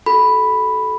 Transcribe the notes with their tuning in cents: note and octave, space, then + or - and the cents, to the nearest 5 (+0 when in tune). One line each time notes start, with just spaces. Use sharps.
F#4 +25 A4 -25 B5 +0